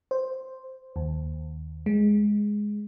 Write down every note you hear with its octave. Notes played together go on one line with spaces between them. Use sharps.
C5
D#2
G#3